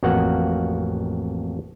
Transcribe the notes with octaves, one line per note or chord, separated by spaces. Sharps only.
A1 F2 A#3 F#4 F5 F#5